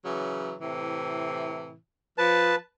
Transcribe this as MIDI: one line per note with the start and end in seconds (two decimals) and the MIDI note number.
0.05 0.53 49
0.05 0.53 52
0.05 0.53 54
0.61 1.75 45
0.61 1.75 48
0.61 1.75 52
2.18 2.53 53
2.18 2.56 71
2.18 2.56 81